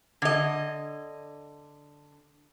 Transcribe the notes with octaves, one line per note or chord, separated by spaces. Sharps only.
D3 D#5